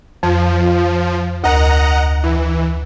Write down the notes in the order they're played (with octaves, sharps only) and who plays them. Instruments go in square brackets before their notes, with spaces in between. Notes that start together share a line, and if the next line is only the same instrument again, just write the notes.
[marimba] F2 [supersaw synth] F3
[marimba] D2 A#4 [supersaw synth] D#5 F#5 A#5
[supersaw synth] E3